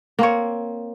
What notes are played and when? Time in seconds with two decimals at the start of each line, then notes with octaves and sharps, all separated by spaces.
0.19 A#3 C4 C#5